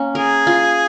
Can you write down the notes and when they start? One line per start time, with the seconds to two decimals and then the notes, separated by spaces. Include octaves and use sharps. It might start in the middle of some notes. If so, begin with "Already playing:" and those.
Already playing: A#3 C#4
0.15 G#4 A#4
0.47 F4